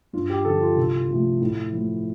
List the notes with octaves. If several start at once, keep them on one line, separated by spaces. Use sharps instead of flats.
G2 F4
G4
D3 F3 A4
F4
C2
C3 F3 A3
A2
F3 A3